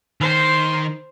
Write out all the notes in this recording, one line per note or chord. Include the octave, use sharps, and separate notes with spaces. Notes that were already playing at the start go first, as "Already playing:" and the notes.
D#3 C5 C6